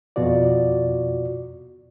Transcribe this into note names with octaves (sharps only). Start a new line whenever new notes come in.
F2 B2 F4 F#4 D5